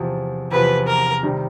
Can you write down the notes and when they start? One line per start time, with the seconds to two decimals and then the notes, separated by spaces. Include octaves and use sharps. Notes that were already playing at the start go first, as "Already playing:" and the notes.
Already playing: E2 C3 F3
0.51 E2 C3 F3 B4
0.87 A#4
1.23 C3 D#3 G3